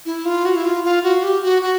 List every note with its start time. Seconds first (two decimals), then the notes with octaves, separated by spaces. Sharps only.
0.06 E4
0.25 F4
0.45 F#4
0.56 E4
0.65 F4
0.84 F4
1.03 F#4
1.23 G4
1.43 F#4
1.62 F#4